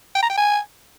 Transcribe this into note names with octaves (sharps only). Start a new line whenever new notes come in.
G5
A#5
G5
G#5